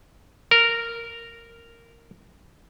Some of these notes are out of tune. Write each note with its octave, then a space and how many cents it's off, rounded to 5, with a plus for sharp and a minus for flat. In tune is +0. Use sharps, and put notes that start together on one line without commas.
A#4 -10